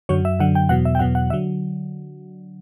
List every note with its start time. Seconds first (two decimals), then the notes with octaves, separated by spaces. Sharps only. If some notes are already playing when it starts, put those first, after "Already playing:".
0.09 F#2 D3 F#3 C#5
0.25 E5
0.39 F#2 D3 F#3 F#5
0.55 G5
0.69 E2 B2 F#3 F#5
0.85 E5
0.95 G5
0.99 E2 B2 F#3 F#5
1.15 F#5
1.30 D3 F#3 E5